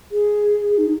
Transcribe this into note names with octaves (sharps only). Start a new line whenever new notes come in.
G#4
D#4